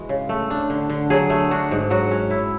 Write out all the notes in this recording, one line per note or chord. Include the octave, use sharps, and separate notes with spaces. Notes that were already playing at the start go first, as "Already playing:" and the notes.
Already playing: E3 G#3 F#4
C#3
A3
D4
D3
D3
F#3 G#4
A3
D4 F#4
G#2
F#3 F#4
C#4
E4